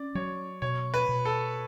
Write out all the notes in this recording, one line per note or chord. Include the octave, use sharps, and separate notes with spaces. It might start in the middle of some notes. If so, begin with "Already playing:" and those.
Already playing: C#4 D5
F#3 C#5
B2 C#5
B4
B2
A4